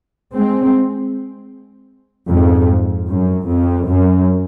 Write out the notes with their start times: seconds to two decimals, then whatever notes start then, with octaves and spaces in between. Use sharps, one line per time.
0.34 G#3 C4
2.30 F2 G#2
3.09 F#2
3.48 F2
3.87 F#2